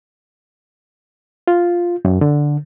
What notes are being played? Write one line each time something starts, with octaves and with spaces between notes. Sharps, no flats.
F4
F#2
D3